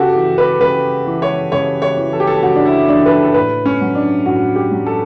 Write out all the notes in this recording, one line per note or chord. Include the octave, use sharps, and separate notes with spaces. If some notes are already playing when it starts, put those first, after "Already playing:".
Already playing: C#3 F#4 G4 A4
E3
B4
C#3 B4
E3
C#5
C#3 C#5
C#5
E3
A4
G4
A4
C#3 F#4
D4
E4
E3 D4
B4
A4
A4
A2 B4
C#4
F#3
D4
A2 F#4
G4
F#3
A4